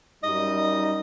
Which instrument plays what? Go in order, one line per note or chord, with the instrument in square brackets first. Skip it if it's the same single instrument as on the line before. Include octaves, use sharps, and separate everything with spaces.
[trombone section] F#2 G3 D#4 [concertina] D#5